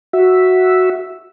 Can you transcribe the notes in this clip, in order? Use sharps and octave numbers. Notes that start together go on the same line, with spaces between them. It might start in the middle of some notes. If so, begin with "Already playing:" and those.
F#4 E5